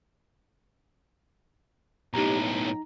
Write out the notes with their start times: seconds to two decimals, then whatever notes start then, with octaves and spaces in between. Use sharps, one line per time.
2.14 B1 A2 D#4 G4 A#5
2.46 G5